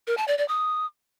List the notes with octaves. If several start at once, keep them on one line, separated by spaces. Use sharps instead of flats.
A#4
A5
D5
D5
D#6